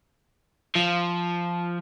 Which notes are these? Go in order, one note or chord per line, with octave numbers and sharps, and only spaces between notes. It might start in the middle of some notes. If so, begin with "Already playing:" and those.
F3